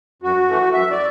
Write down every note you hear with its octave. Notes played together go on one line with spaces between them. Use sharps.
F#2 F#4
E3 A3
F#2 E5
D5